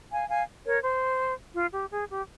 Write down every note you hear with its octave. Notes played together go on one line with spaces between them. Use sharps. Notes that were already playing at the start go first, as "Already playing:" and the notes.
F5 G#5
F5 G#5
A#4 C#5
C5
F4
G4
G#4
G4